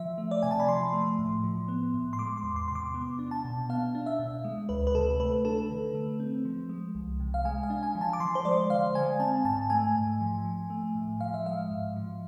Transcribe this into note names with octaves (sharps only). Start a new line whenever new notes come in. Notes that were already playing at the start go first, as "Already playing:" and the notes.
Already playing: F3 E5
A3
D5
C3 G#5
A5
B5
F3 C6
A3
A2
F3
B3
A2
C6
G#3 D6
C6
E2
C6
C3 C6
D6
B3
D4
A5
B2
B3 F5
D4
E5
B2
G#3
D2 B4
B4
C3 A4
A3 B4
D4 A4
D3
A3
C4
F3
G#3
C2
C3
F5
G#3 G#5
F5
D4
G#5
F3
A5
D6
F3 C6
C5
G#3 D5
D3 F5
G#3 G#5
C4 A5
G#2 A5
A3 G#5
G#2
F3
F3
A3
A2
F3 F5
E5
G#3 F5
G#2
F3